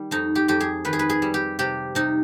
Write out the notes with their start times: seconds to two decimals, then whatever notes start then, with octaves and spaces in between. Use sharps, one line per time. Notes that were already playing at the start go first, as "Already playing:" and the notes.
Already playing: D#3 G3
0.11 F2 D#4
0.35 G4
0.48 F2 G4
0.60 G#4
0.85 D#3 B4
0.93 G#4
0.99 B4
1.10 G#4
1.22 G3
1.34 G4
1.59 C3 G4
1.95 C3 D#4